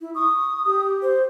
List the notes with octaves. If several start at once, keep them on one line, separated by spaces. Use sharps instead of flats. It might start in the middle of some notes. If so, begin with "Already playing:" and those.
E4
C#6 D#6
G4
C5